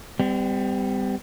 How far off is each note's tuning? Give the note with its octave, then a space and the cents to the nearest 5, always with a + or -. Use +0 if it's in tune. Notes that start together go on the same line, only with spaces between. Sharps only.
G3 +15 C4 -45